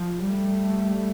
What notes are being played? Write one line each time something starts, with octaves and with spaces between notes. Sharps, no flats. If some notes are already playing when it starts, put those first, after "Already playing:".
Already playing: F3
G3 A3